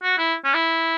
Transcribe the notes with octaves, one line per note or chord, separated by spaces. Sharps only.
F#4
E4
C#4
E4